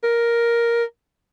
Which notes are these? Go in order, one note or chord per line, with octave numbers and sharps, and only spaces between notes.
A#4